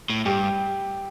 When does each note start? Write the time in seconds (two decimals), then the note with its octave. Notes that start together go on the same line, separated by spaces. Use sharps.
0.10 A2
0.25 G2 G4